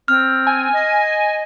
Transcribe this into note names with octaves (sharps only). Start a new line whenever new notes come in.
C4 F6
G#5
D#5